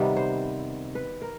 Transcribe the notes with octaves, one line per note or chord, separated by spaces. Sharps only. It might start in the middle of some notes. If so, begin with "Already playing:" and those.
Already playing: C3 D#3 G3 B3
C5
B4
A#4